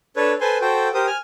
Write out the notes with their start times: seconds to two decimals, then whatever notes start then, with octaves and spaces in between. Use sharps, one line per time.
0.16 D4 A4 B4 C#5
0.41 A4 B4 C5 G#5 C6
0.61 F#4 A4 C5 G5
0.94 G4 A#4 C5 D#6
1.07 G#5 F6